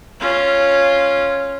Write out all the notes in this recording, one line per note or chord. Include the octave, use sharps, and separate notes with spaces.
C#4 F4